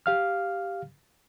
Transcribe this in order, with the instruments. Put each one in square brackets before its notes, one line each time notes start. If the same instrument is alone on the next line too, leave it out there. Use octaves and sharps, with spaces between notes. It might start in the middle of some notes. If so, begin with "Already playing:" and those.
[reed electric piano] G4 F5 F6